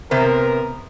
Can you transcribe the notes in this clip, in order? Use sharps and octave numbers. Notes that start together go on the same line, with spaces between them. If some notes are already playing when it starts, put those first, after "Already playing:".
C3 B3 A#4 C5